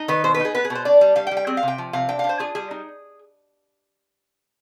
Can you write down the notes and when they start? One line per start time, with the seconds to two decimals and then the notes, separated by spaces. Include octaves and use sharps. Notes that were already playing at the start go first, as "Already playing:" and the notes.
Already playing: D#4
0.08 D#3 B4
0.24 B2 C5
0.34 B4
0.40 D#4
0.45 G#4
0.54 B3 B4
0.65 G#4
0.70 B2
0.75 C5
0.85 D4 D5
1.01 G3
1.16 G3 F5
1.27 G5
1.31 G3
1.37 G5
1.47 C4 G#4
1.57 F5
1.63 C3 G5
1.78 F3
1.93 C3 F5
2.09 D4 G5
2.19 D4 F5
2.29 C5
2.39 F4 G#4
2.55 G3 G#4
2.71 D#4